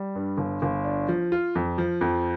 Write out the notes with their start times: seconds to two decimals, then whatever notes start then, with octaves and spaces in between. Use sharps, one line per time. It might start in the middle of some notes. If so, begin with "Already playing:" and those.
Already playing: G3
0.15 G2
0.38 G1
0.62 G1
0.84 D4
1.08 F3
1.32 F4
1.55 F2
1.78 F3
2.01 F2